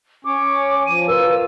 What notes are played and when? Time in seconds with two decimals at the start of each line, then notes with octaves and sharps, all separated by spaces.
0.25 C#4 C#5 D6
0.86 F3 D#7
1.08 F4 A#4 B4 E6